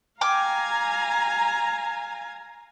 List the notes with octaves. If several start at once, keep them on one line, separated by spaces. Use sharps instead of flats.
F5 G5 G#5 A#5 D6 F6